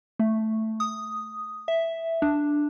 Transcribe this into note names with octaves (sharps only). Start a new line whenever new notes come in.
A3
D#6
E5
D4